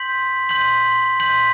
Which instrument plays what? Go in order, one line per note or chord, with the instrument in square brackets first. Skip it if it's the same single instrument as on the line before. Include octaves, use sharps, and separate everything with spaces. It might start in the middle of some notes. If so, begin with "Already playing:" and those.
Already playing: [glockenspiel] C6 G6 B6 F#7
C6 G6 B6 F#7
C6 G6 B6 F#7